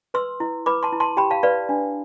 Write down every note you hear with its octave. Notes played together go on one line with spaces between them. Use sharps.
B4 C6 E6
E4
B4 B5 D6
A5 C6
E4
A5 C6
G4 G5 B5
F5 A5
B4 D5 F5
D4